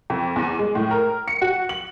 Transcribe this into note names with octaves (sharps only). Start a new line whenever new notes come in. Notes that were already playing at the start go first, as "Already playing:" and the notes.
F2
E2
G#3
A2
A#4
C#7
F#4
F#7